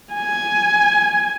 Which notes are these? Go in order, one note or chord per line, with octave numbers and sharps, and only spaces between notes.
G#5